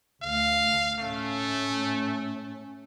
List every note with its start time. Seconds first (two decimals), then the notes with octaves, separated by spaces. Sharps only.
0.22 D2 A3 F5
0.99 A2 A3 C#4